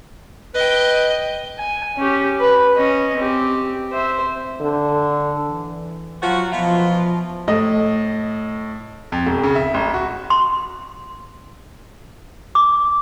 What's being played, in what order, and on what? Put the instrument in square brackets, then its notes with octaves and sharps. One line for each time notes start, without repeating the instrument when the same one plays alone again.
[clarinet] B4 [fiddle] D#5 G5
[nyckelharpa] G#5
C#4 G4
B4
C#4 D#5
C4 G4
C5 E5
[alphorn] D3
[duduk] E3
[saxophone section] F3 F#4 [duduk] F#3
[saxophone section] B2 E3 F4 [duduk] F3
[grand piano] A2 D#5
F2
E1
C#3
E5
A1
F#4
[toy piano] C6
D6